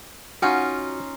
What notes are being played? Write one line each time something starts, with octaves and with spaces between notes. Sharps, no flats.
C#4 D#4 F4 F#4